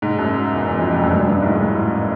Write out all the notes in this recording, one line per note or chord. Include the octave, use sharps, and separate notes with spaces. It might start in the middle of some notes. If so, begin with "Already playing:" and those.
G#2
F#2
E2
E2
F2
F2
F#2
G2
F#2
G2
G#2
A2